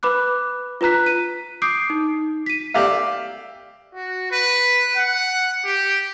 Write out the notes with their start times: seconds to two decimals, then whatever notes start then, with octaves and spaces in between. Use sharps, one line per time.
0.03 B4 B5 D6 F#6
0.81 F4 B4 A#5 F#6 B6
1.06 D#7
1.62 D6 D#6 G6 C7 D7
1.90 D#4
2.46 B6 D#7
2.74 G4 D5 E5 F5
3.95 F#4
4.31 B4
4.96 F#5
5.65 G4